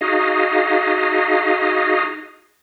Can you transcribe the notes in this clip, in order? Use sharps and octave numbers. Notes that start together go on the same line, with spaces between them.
D#4 F#4 G#4 D#5 F5